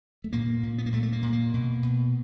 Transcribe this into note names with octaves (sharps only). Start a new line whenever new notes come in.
A3
A#2 A#3
A#2
B3
A#3
A#2 A3
A3
A#3
A#2
A#3
B2
B2